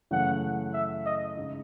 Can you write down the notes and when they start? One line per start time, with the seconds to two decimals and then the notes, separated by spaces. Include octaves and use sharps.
0.11 F#2 C#3 E3 A3 F#5
0.73 E5
1.05 D#5
1.37 C#3 G#3 D#4